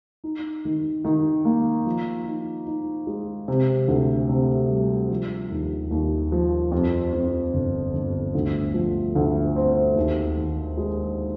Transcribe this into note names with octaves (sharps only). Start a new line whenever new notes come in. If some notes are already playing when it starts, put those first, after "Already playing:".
D#4
D#3
D#3
A#3
F3
D#4
D#4
G#3
C3
D2
C3
G3
F3
D#2
D#2
F3
F2
F2
G1
G1
D2
F3
D2
C4
D#2
D#3
G#3